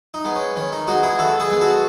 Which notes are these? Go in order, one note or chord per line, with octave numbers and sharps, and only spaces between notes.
D#4
G#3 B3
C#4
D#3 C#4
D#4
G#3 B3 D#4 F#4
E4 G#4
D#3 F#4 A4
G#4 B4
G#3 B3
F#4 A4